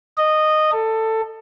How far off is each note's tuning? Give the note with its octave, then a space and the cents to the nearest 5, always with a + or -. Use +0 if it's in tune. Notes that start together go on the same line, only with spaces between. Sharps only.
D#5 -10
A4 +15